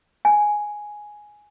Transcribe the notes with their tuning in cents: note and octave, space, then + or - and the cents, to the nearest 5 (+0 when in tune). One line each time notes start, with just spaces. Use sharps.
G#5 +5